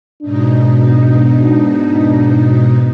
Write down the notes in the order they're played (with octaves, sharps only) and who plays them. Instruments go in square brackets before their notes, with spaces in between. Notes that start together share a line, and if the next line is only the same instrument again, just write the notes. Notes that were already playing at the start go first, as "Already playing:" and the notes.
[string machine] G#2 B2 D#4 [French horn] D4